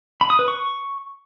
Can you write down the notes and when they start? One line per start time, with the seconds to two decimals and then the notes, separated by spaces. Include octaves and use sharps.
0.21 B5
0.30 D#6
0.39 B4
0.48 C#6